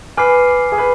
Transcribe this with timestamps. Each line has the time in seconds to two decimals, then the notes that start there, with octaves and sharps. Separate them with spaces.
0.17 B4 G#5 D6 F6 C7
0.72 G#4
0.78 B4